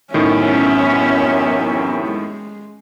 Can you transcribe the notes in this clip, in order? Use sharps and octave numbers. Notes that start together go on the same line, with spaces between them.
F#2 A2 C3 D#3 E3 B3 C#4 E5
G#3